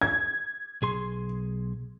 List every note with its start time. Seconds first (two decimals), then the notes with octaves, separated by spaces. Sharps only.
0.01 G#6
0.82 B1 G#4 C6